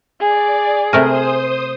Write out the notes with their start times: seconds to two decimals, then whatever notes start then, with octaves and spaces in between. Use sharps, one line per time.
0.20 G#4 D5
0.93 C3 A3 A#4 C5 D#6